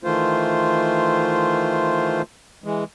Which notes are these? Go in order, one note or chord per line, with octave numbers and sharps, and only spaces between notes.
D#3 E3 A3 F4 C5
E3 G#3